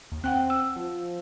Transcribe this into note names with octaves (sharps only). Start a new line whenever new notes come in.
D#2
C4 F#5 G5 F#6
E6
F3